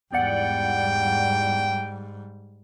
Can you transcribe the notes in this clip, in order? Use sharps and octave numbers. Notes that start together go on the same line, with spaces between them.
E2 G#2 G3 D5 F#5 G5